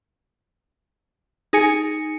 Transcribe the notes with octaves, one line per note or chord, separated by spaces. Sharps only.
D#4 G#4 G#5 C#7